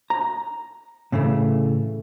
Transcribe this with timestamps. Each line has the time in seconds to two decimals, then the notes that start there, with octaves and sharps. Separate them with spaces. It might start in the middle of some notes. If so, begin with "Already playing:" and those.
0.10 A#5
1.12 A2 C#3 E3 A3